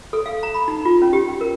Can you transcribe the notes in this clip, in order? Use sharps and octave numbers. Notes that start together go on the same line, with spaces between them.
A4
F5
A#5
B5
D#4
F4
C#4
G4
G5
A#4